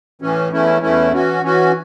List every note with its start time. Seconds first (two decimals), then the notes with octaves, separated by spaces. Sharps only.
0.22 A2 E3 C#4
0.51 E2 E3 A3 C#4 E4
0.81 E2 E3 A3 C#4 E4
1.12 E3 C#4 F#4
1.42 E3 C#4 F#4